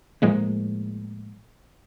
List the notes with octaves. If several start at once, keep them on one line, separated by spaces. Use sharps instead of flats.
A2 F3 G#3 A#3